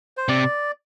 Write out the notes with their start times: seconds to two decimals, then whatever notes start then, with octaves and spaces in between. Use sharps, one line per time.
0.17 C5
0.28 C3 D5